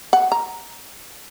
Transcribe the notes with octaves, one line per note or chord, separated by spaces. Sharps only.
F#5
A#5